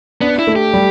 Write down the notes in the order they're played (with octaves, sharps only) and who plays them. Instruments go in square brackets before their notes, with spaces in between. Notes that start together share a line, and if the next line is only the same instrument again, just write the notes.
[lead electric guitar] B3 [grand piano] D4
[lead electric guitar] E4
[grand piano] A3
[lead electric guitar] G4
[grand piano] G3